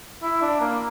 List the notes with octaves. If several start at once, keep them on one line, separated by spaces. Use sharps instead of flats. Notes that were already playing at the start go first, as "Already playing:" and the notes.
E4
D4
A#3